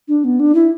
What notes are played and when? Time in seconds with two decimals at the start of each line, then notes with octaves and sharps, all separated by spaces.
0.08 D4
0.24 B3
0.40 D4
0.55 E4